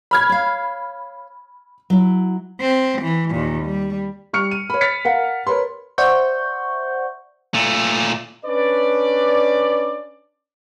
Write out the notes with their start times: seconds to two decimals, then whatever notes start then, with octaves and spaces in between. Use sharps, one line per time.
0.11 B5 F6 G#6
0.29 C#5 F5
1.90 F#3 E4
2.61 C4
3.01 E3
3.31 D#2 A#2
3.65 G3
4.33 G3 C#6 F6 C#7
4.51 D#7
4.70 C#5 B5
4.81 B5 F6 A6 B6 C#7
5.05 A#4 F5 F#5
5.47 A#4 B4 C#5 B5 C6
5.98 C5 D5 E5 F#5 C#6 G6
7.54 A#2 A3
8.45 C#4 D4 B4 D5